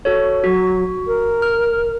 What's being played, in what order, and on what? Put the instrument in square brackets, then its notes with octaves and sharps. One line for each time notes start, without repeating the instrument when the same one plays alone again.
[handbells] F#4 A4 C#5
[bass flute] F#3 [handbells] F#4
[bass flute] A#4
[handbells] F6